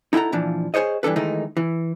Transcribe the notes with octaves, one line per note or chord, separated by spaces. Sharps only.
D#4 E4 A4 F#5 A#5
A#2 E3 F3 D4
G#4 A4 C5 C#5 D#5
G2 E3 D4 A4 B4
D#3 E3 G#3 A3 D#4
E3